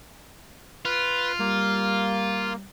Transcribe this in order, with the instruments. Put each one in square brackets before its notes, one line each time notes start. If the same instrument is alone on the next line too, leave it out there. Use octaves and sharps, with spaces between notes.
[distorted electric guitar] F4 [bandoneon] B4
[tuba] G3 [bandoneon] A#3